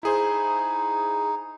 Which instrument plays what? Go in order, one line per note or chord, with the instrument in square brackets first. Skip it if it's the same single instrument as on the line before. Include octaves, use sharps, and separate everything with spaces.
[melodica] D#4 [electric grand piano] E4 G#4 C5